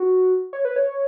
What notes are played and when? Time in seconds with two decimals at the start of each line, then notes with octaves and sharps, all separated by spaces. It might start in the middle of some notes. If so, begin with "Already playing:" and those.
Already playing: F#4
0.53 C#5
0.65 B4
0.76 C#5